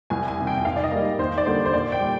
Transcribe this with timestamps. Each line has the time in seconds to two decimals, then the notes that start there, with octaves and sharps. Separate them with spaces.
0.10 C2 G#5
0.28 G#5
0.38 C3 D#3
0.47 G5
0.58 G5
0.65 G#2 F5
0.76 D5
0.84 D#5
0.91 G3 A#3
1.19 D#2 C5
1.38 D5
1.46 D3 G3 A#3 C5
1.65 C5
1.73 A#2 D5
1.92 G5
2.01 G3